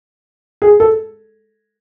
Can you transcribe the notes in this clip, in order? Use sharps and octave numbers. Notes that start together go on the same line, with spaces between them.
G#4
A4